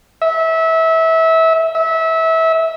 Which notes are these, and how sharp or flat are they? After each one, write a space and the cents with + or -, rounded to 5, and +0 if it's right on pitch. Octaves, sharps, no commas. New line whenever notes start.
E5 -25
E5 -25